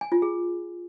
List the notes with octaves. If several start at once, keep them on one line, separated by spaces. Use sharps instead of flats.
G#5
F4
G#4